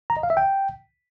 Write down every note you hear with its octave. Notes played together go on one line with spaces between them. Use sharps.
A#5
D#5
F5
E5
G5